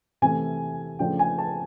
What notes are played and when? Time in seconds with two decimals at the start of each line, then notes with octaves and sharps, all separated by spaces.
0.22 C3 E3 A3 G#5
0.99 C#3 F3 A3 D4 G5
1.19 G#5
1.38 A5